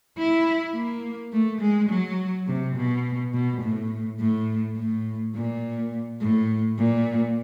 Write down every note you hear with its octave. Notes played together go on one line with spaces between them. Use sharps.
E4
A#3
A3
G#3
F#3
C3
B2
B2
A2
A2
A2
A#2
A2
A#2